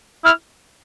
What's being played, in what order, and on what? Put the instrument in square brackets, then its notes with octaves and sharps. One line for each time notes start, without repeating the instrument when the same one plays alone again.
[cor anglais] E4 [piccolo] F6